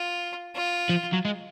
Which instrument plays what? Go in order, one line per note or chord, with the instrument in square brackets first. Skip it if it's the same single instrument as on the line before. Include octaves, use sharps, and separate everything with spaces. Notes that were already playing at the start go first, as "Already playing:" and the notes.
Already playing: [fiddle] F4
F4
[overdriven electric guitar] F3
F#3
G#3